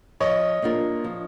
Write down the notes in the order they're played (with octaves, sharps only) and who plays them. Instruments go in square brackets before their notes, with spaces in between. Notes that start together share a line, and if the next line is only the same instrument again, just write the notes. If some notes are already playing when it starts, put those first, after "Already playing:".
[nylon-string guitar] F3 [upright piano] C#5 D#5
[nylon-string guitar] A#3 D4 F4 A#4
F3